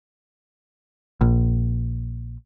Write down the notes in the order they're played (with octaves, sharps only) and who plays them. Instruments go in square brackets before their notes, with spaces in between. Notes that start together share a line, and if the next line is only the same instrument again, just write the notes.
[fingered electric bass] A#1